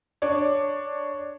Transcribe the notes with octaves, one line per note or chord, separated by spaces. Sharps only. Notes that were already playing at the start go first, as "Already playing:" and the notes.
D4 C#5 D6